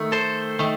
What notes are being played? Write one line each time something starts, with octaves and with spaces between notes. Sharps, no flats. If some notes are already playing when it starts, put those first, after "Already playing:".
Already playing: D#3 A3
A4 C5
D#3 A3